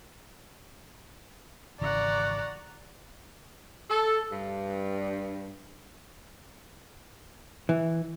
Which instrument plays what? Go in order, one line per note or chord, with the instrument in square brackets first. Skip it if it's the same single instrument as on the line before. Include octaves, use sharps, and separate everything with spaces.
[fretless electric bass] G#1 C#3 E3 [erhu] D5 [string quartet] F#5 A#5 C#6
[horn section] A4
G2
[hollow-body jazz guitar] E3